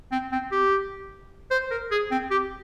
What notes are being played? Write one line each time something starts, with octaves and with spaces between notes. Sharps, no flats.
C4
C4
G4
C5
A#4
G#4
C4
G4